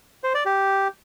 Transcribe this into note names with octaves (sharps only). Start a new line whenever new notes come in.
C5
D5
G4